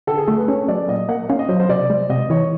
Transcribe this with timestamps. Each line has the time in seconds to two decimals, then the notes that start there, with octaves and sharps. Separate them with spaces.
0.07 D3 A4
0.18 G#4
0.27 A3 A4
0.38 B4
0.48 C#4 C#5
0.68 F#3 D5
0.88 A#2 D#5
1.09 A#3 F#5
1.29 C#4 F5
1.39 D#5
1.49 F#3 C5
1.60 C5
1.69 C3 D5
1.90 G#3
2.10 C3 D#5
2.30 E3 C#5